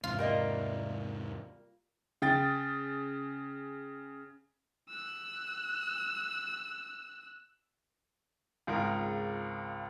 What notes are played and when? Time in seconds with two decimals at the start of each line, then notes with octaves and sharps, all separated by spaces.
0.04 E2 G#2 C3 F4
0.18 G3 A#3 A#4 D#5 E5
2.22 C#3 G5 A6
4.89 E6 F#6
8.67 G#1 C#2 F4 G#4 A#4